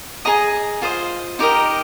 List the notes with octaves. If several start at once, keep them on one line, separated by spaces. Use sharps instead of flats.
G#4 D#5 A#5
F4 C5 D#5
D#4 G4 A#4 D#5